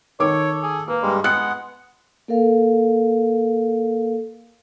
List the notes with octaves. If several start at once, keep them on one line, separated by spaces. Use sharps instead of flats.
D#3 A4 C#5 D6
G#4
A#3 B4
G2 G3 G#3
G#3 B3 F#5 F#6 C#7
A#3 A4 A#4 F5